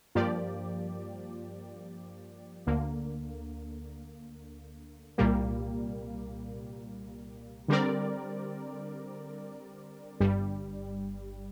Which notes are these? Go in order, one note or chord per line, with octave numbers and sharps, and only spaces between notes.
G2 F3 A#3 G4 D5
D2 D3 A#3
C2 A#2 G3 A#3
D3 G3 C4 A#4 D5
G1 G2 G3